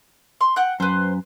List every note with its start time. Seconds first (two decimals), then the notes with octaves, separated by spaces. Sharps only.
0.41 C6
0.56 F#5 G5 F#6
0.80 F#2 B4 C5